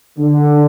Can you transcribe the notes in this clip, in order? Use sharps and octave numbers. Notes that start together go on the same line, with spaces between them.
D3